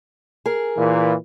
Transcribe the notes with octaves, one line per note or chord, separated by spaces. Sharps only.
G#4 A#4
A#2 E3